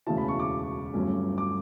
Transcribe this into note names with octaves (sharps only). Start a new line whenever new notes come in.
E1 D2 C#3 E3 A5
B5
C#6
D6
G1 G2 F#3 A3 C#4
D6